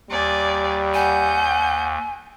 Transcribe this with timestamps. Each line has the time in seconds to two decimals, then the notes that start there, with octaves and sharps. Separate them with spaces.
0.10 D#2 G3 D5 G#5
0.94 F#5 G#5 G6